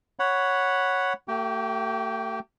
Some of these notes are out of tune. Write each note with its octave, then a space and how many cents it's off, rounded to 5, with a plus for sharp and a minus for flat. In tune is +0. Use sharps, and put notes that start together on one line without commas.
C#5 +0 F#5 +0 B5 +0
A3 +35 G4 -35 G5 +0